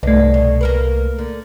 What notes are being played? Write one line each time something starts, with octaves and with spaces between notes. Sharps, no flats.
C2 G#2 A3 D4
B2
A#3 A#4 B4
D3